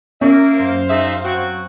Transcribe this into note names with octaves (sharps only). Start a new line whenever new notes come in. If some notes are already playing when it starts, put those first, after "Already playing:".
A#3 C#4 E5
F#2 C5 F5
D#4 G#4 E5
F#3 C4 F#4